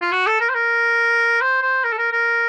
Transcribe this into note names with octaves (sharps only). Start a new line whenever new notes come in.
F4
F#4
A4
A#4
C5
A#4
C5
C5
A#4
A4
A#4
A#4